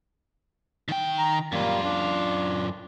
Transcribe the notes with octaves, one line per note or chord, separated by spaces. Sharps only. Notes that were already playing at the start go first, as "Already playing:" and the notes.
D#3 G5
A#5
F#2 G3 A#3 F4
D4